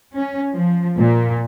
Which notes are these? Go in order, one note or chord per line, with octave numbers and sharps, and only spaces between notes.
C#4
F3
A#2